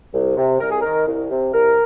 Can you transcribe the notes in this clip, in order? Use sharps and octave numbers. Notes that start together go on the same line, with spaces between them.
C2
C3
C2 A#4
G#4
D#3 A#4
C2
C3
C2 A#4